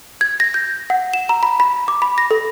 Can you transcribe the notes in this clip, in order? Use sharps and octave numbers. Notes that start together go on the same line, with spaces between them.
G#6
A#6
G6
F#5
E7
A#5
B5
B5
D6
B5
A#6
A4